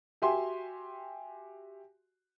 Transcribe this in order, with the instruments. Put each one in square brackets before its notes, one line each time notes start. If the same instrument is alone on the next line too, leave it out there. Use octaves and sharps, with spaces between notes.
[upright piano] F#4 G4 E5 G#5 C6